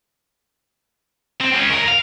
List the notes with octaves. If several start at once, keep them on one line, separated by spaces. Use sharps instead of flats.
C4
G#3 C#4
D2 A#4
F5